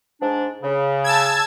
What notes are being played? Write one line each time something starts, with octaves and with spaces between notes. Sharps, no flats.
G#2 D4
C#3
A5 E6 G#6